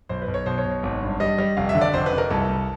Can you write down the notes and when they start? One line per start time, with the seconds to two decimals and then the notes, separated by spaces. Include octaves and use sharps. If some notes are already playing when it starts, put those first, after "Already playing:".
0.09 B1 C5
0.22 B4
0.28 B1
0.34 C#5
0.46 B2 C5
0.58 C#5
0.65 B1
0.83 G#1
1.02 G2
1.20 G3 D#5
1.38 G3
1.57 F1 F5
1.69 E5
1.75 D3
1.81 D5
1.94 F1 C5
2.06 B4
2.12 F1
2.18 A#4
2.30 C2 A4
2.49 C2